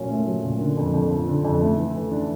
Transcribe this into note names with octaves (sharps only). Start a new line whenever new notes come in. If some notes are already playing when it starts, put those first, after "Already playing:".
Already playing: A#2 F#3 C#4
A3
F#3
A#2
D3
F2
F2
F3
D3
F2
A3
E3
E3
D4